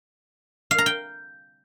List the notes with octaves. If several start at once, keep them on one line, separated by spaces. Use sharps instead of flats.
F5
A#5
G5